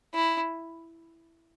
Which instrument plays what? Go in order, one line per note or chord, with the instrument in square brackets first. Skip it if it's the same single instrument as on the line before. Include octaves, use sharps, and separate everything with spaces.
[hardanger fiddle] E4